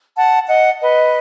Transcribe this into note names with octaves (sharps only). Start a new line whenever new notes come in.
F#5 A5
D#5 F#5
B4 D#5